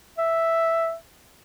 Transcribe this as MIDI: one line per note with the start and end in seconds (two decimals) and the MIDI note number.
0.18 0.94 76